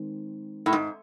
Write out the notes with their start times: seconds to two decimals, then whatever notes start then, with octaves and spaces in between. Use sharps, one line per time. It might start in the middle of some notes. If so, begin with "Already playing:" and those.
Already playing: D#3 G#3 C4
0.66 A2
0.73 G#2